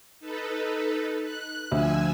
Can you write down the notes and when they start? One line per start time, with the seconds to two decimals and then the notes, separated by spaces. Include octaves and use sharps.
0.20 D#4 A4 B4
1.22 F#6
1.71 D2 F3 G#5 E6